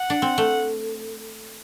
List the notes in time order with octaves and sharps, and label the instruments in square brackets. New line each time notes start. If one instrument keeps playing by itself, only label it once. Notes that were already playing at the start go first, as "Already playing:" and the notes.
Already playing: [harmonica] F#5
[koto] D4
C4
A3